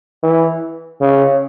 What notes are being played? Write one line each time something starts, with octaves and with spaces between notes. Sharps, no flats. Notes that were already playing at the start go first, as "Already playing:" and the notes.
E3
C#3